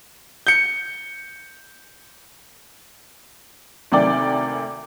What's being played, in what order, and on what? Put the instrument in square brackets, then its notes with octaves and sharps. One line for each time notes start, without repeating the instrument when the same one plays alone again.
[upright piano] G6 C#7
[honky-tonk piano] D2 C3 D#3 D5 G5 D6